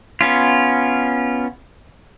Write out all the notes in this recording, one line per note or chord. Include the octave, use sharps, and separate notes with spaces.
B3 C#4 F4